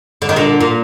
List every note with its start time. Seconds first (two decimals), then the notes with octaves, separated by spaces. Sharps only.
0.22 D3
0.29 D#3
0.36 A#2 D3
0.61 A#2